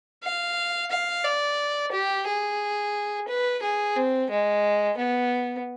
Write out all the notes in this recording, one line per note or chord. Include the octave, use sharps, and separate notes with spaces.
F5
F5
D5
G4
G#4
B4
G#4
C4
G#3
B3